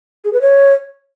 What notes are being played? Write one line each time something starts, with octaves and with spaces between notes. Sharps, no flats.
G#4
B4
C#5